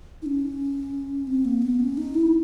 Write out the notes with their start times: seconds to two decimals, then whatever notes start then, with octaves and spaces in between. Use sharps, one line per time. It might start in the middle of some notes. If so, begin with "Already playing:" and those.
0.22 D#4
0.26 C#4
1.27 C4
1.45 A#3
1.62 B3
1.80 C#4
1.97 D#4
2.14 E4